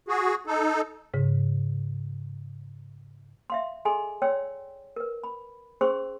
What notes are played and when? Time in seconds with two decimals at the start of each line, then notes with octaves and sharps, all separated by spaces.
0.08 F#4 G#4
0.47 D#4 A4
1.14 G#2 C#3
3.50 E5 F5 C6
3.85 G#4 A4 D#5 G#5 C6
4.22 C#5 D5 G5 C6 E6
4.96 A#4 B4
5.24 B5
5.81 C#4 G#4 C5 C6 C#6 E6